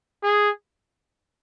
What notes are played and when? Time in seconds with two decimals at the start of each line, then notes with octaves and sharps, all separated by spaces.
0.23 G#4